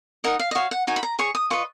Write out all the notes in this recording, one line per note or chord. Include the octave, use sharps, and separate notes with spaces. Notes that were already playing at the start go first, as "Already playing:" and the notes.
D#4 A#4 D#5 F#5
F5
D#5
F#4 C#5 F5
F#5
D#4 F#4 A#4 G#5
B5
A#5
G#4 C#5 C#6
D#6
F4 B4 D#5 C#6